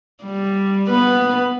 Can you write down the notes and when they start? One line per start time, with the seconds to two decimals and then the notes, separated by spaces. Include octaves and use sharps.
0.24 G3
0.88 B3 B4